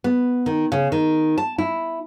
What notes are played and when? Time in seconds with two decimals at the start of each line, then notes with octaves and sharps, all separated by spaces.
0.04 B3
0.46 D#3
0.72 C#3
0.92 D#3
1.38 A5
1.58 E4